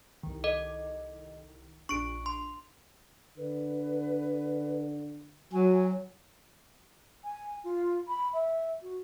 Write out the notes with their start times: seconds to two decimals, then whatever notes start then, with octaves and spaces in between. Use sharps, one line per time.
0.23 C2 D#3
0.44 A4 D#5
1.89 A#1 D4 C#6 D7
2.26 C6
3.38 D3 B4
5.52 F#3 G#5
7.24 G#5
7.64 F4
8.08 B5
8.33 E5
8.82 F#4